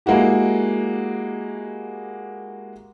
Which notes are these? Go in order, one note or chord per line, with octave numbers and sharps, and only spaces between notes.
G#3 A#3 E4 F#4 G4